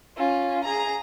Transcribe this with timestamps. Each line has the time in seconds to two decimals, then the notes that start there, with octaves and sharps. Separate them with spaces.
0.17 C#4 F4
0.65 G#4 A#5